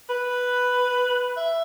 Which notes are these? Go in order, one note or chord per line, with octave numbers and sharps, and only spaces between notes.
B4
E5